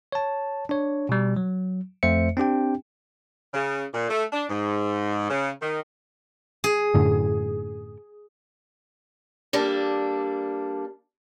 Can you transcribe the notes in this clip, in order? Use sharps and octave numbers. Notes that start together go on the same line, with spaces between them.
C#5 A5
D4 C#5
B2 G3
F#3
F2 A3 C5 E5 C#7
C4 D4 G4 G5
C#3
A#2
A3
D4
G#2
C#3
D#3
G#4
F#2 A2 D3
G3 A#3 D4 A4